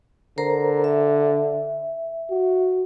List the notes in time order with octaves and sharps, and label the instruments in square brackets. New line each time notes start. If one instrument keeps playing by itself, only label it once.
[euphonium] D3 [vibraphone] A#4 C5 A#5
[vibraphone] E5
[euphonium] F#4